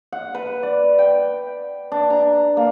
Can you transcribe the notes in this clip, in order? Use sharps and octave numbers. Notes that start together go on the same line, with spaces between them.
F#5
B4
D5
G5
D4
A#5
A#3